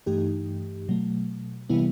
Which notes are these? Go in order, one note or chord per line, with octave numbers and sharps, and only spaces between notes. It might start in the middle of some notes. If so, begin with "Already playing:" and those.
G2 E3 A3 D#4 G4
B2 F#3 A3
C3 E3 G3 B3 E4